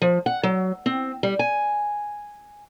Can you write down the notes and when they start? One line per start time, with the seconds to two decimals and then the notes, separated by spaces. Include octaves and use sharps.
0.02 F3
0.26 F#5
0.43 F#3
0.86 C4
1.23 G3
1.39 G#5